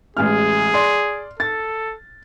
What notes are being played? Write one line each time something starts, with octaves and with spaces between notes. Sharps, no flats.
A1 G#3 G#4 F6
D5 C6
A4 A6